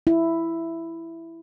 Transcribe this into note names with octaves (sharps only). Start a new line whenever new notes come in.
E4